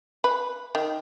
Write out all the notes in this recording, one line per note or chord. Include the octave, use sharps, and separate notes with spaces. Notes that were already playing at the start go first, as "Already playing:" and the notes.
B4
D#3